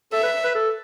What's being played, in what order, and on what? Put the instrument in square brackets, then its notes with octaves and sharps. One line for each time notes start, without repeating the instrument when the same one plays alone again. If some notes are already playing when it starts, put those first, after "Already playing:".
[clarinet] A4 [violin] E5
[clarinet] B4
B4
A4